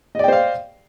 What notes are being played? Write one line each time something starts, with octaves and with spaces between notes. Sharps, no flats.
C5 D5 D#5 F5 G5